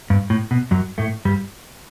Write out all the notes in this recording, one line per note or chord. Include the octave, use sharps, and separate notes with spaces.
G2
A2
B2
F#2 F#3
A2 A3
G2 G3